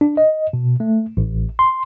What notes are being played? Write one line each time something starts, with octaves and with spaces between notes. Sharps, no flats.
D4
D#5
B2
A3
A1
C6